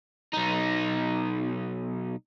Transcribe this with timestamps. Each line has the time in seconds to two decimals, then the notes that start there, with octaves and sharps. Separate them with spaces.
0.33 B1 D#4